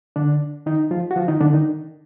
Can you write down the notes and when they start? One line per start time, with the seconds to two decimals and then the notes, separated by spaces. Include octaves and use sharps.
0.16 D3 D4
0.66 D#3 D#4
0.91 F3 F4
1.11 F#4
1.16 F3 F4
1.28 D#3 D#4
1.41 D3 D4
1.53 D#3 D#4